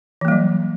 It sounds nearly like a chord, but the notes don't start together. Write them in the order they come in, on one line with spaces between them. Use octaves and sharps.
E3 A#3 G3 F#3